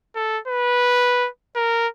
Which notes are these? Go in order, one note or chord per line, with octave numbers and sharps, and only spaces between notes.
A4
B4
A#4